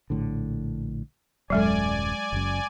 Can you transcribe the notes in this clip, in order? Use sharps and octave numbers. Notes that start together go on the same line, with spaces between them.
A#1 A2 D3
D#1 F#2 F#3 G#3 A4 D5 G#5
F#1 F#2